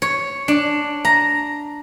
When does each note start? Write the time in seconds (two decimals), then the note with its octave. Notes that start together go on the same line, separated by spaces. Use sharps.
0.02 C#5
0.48 D4
1.05 A#5